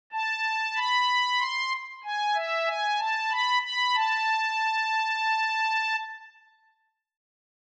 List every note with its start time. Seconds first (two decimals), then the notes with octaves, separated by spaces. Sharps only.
0.12 A5
0.76 B5
1.39 C6
2.04 G#5
2.35 E5
2.67 G#5
2.99 A5
3.31 B5
3.63 B5
3.95 A5